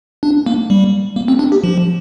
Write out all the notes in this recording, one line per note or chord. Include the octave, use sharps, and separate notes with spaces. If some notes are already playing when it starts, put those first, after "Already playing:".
D4
A#3
G3
A#3
C4
D4
G4
F3